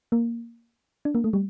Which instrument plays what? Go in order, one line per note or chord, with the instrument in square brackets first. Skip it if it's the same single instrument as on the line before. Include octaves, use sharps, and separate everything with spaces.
[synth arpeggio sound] A#3
D4
A#3
A3
G3